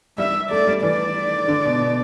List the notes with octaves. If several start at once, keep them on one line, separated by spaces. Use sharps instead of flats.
G3 E5
A3 D5
G3
E3 D5
D3
B2
B2